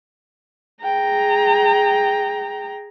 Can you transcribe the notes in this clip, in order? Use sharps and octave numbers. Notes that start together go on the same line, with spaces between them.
G#4 G5 A#5